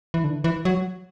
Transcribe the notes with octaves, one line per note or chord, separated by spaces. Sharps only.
E3
D3
E3
F#3